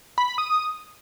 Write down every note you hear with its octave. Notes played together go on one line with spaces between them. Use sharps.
B5
B5
D#6